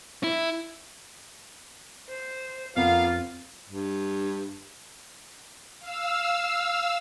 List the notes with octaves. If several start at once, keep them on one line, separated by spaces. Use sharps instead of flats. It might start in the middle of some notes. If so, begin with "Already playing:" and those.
E4
C5
F2 A#3 B3 F4 F5 F6
G2
F5 E6